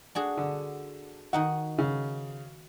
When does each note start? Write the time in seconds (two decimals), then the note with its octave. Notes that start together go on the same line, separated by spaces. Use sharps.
0.15 D4 F#4 G#4
0.37 D3
1.33 D#3 D#4 F#4 F#5
1.78 C#3